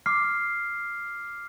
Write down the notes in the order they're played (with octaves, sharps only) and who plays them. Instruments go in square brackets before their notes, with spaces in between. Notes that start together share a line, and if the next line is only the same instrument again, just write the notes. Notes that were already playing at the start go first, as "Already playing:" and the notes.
[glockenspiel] D6 F6 C7